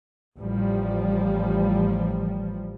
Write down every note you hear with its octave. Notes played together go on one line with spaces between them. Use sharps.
A1 F3 G3